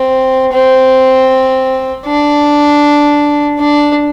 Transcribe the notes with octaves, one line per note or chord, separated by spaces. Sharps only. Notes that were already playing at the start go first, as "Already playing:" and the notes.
Already playing: C4
C4
D4
D4